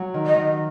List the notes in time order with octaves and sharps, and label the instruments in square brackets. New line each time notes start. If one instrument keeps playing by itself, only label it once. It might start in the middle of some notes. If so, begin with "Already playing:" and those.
Already playing: [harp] F#3
D#3
[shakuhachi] D#5
[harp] D#3